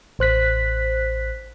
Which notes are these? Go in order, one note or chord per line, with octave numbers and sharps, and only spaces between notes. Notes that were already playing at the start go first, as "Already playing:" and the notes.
A1 C5 F#6 B6